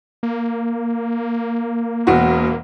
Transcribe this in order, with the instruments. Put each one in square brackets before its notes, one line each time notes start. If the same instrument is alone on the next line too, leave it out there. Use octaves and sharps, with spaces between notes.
[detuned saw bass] A#3
[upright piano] E1 B2 F#4